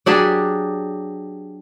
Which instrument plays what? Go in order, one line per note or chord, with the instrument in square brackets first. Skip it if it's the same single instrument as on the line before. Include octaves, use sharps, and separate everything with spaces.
[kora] F#3 D4 G4 G#4